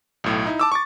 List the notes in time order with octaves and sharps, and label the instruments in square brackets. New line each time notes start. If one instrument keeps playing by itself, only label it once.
[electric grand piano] B1 A2
D#4 E4
A5 D6 E6
C#6 D6 A6